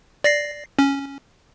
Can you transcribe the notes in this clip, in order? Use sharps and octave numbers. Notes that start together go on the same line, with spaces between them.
D5 A#6 C7
C#4